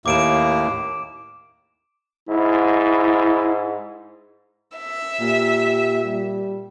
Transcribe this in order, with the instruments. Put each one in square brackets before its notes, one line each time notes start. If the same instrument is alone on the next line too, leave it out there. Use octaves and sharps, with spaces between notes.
[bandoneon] D#2 A2 A#3 [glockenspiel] D6 D7 E7
[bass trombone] G#2 [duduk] E4
[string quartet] E5
[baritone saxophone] A#2 [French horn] G4
[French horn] G3